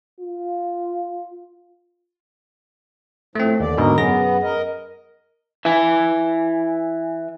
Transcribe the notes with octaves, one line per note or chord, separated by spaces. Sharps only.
F4
A2 F3 A3 C4
D#2 D3 D5
G#2 B2 D3 A#4 D#5
F#2 B3 G#4 A#6
A#4 D#5
E3 E5 G#5